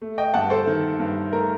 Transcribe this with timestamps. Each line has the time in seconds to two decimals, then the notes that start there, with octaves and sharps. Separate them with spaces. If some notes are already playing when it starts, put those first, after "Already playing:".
0.02 A3
0.18 D#5 G5
0.34 G2 F#5 A5
0.50 A4 C5
0.67 D#3
0.99 G2
1.33 A3 A#4